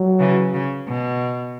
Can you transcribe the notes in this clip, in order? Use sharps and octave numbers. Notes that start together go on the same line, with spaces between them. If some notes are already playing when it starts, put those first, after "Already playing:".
Already playing: F#3
C#3 E3
C#3
B2